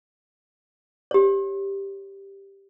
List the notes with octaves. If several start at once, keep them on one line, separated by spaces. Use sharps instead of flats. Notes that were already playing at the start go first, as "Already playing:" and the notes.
G4 C#5